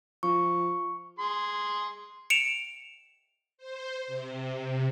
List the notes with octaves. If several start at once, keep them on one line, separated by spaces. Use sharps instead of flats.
F3 C#6
G#4 C6
C#7 D7 E7 F7
C5
C3